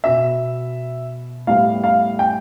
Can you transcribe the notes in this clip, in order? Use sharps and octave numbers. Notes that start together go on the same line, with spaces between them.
B2 B3 E5
A2 G3 B3 F5
F5
G5